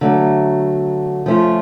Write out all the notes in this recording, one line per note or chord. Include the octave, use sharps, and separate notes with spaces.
D3 F#3 A3
F3 A3 C#4 F4